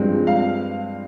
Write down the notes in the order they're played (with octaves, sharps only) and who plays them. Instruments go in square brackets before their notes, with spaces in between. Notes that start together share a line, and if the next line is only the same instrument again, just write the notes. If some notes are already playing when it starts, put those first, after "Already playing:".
Already playing: [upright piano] G2 F3 G#3 C4
F5